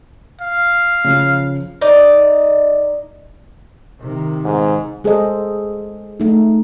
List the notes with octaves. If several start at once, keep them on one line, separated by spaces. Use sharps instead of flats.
F5
C#3 F3
D#4 D5
C3 D#3
G#2
G#3 G#4 A4 C5 D#5
A3 D#4